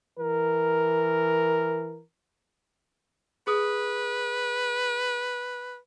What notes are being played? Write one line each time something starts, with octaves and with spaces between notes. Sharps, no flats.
E3 A#4
G#4 B4 D#6